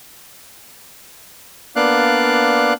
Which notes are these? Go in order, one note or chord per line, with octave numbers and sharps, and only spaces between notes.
A#3 B3 D4 D5 F5 F#6